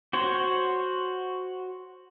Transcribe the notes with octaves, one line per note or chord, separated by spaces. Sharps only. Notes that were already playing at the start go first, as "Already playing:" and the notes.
F#4 C5 C#5